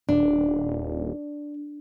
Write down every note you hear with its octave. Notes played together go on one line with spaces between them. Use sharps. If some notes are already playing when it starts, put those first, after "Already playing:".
D#1 D4